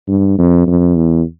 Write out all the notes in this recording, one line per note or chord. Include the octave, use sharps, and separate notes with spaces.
G2
F2
F2
E2